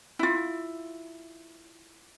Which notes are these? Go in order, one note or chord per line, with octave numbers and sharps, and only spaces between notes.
E4 F4